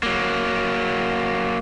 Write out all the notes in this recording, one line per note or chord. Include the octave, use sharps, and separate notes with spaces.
F#3 A#3